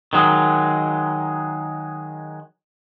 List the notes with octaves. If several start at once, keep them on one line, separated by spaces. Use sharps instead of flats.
D#3 F#3 G#3